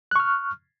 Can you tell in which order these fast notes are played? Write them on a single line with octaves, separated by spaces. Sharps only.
F#6 C#6 F6